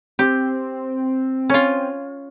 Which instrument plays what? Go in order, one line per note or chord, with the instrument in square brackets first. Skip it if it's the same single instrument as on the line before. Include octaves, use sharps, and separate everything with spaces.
[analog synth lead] C4 [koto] G4
[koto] C#4 F4